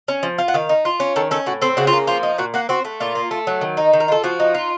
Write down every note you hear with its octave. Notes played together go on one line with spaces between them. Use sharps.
C#4
F3
F4
F#5
D#3 F5
D#4
F4
C#4
D#3 A4
C#4 A4
A2 F#4
C4 A4
C#3 F#4
F4
A#3
F3 F4
D#4
A#2 F#4
A#3 F#4
C4 F#4
A3
A#2 F4
A#3
A3
F#3
D#3
D#4
D#3
A#4
F4 A4
F3 F#4
D#4
F4